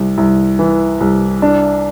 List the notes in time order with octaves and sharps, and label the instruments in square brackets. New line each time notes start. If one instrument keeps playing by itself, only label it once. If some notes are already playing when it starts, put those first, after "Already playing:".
Already playing: [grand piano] C2
C2
E3
C2
D4